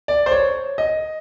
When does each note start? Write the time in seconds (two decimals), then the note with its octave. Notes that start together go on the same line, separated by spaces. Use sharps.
0.08 D5
0.26 C5
0.31 C#5
0.78 D#5